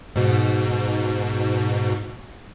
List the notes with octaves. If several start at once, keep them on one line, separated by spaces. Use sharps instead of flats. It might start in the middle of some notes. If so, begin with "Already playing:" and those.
G#2 B2